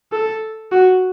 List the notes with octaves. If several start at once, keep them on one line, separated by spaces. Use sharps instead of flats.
A4
F#4